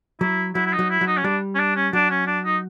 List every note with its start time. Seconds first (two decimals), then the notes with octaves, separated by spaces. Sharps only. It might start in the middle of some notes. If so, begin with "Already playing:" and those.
0.21 F#3 E4
0.55 F#3 E4
0.66 E4
0.73 D#4
0.79 F#3
0.90 E4
1.01 F#3
1.07 D#4
1.17 C#4
1.24 G3 D4
1.54 C#4
1.59 D4
1.76 C#4
1.93 F#3 D4
2.10 C#4
2.27 D4
2.45 D#4